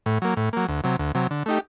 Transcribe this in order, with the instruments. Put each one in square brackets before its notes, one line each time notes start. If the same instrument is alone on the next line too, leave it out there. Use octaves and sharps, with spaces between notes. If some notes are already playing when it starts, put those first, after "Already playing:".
[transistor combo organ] A2
F#3 A#3
A2
F#3 A#3
D2
C3 F#3
D2
C3 F#3
D3
A3 D#4 G4